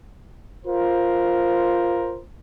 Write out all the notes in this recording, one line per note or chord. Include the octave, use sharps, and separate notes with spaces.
F4 A#4 C5